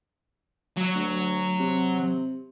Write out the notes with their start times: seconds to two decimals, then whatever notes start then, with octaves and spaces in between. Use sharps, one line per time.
0.77 F#3
0.94 D2
1.60 C3